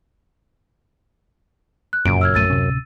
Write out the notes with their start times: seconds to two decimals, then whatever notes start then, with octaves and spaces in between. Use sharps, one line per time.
1.93 F#6
2.05 F1 F#2 A#2 C#3 D7
2.21 E6 F6 G#6
2.34 D1 A#1 A3 E6 A6 D#7
2.50 D1 C3 C#4